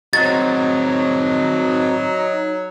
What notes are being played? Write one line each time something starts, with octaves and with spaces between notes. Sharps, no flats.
F#3 C4 D#4 F#4 A6